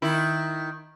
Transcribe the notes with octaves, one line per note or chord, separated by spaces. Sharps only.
D#3 E4